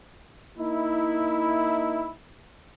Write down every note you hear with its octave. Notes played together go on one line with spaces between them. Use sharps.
A#3 D#4 E4